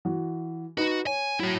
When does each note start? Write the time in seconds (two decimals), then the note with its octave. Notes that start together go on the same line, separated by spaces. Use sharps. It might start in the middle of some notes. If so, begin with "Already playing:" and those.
0.05 E3 F#4
0.78 D#4 F#4 B4
1.07 C#5 G#5
1.40 F#3 E4 C#5